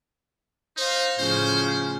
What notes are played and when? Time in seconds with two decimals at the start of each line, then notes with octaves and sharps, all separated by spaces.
0.77 D#4 C5 F5
1.19 A2 C#3 F3 C5